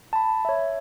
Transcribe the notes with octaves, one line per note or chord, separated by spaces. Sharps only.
A5 B5
C#5 E5